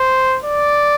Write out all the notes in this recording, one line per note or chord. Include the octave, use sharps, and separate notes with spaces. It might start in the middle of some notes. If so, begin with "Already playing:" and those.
Already playing: C5
D5